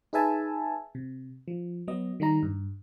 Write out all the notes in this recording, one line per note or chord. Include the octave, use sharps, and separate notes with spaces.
D#4 G#4 B4 E5 G#5 A5
C3
F3
F#3 B3 D#5
D#3 G3 D#4 A#5
G2